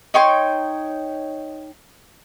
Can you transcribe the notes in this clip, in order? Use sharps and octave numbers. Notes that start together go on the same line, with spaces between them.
D#4 C#5 G5 C6